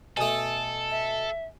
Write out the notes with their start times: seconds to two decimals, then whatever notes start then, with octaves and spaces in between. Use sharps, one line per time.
0.17 B2 A3 A4 G#5 D#6
0.90 E5